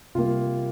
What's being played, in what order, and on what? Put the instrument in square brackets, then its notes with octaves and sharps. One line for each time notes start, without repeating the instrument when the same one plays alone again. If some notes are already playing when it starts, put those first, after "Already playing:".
[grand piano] C3 G3 A#3 F4